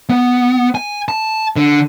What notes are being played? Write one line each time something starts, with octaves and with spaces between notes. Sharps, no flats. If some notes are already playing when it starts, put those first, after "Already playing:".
B3
G#5
A5
D3